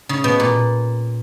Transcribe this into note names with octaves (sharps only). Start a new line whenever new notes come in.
C#3
B2
A#2